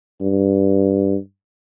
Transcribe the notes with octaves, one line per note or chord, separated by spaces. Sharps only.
G2